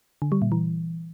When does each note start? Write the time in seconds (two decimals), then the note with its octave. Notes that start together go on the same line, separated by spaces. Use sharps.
0.22 D3
0.32 G3
0.42 A#2
0.52 E3